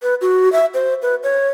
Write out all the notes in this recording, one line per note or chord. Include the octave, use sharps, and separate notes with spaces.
B4
F#4
E5
C5
B4
C#5